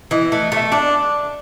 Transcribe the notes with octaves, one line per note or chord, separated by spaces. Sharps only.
E3 D#5
A3
D#5
A3 E5
D4 A5